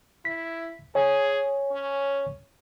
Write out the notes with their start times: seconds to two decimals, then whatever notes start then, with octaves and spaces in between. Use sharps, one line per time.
0.25 E4 B6
0.95 G#4 C#5 G#5
1.71 C#4